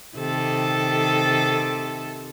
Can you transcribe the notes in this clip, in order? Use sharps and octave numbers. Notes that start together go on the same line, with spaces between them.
C3 D#3 A4